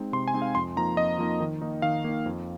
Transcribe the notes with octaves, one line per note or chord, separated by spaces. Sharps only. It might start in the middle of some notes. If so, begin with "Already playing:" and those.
Already playing: G#3 C4 D#4
C3 C6
G#5
G#3 C4 D#4
F5
F2 C6
F3 A#3 D#4 A#5
F2 D#5
F3 A#3 D#4
D#3
A#3 D#4
D#3 F5
A#3 D#4
F2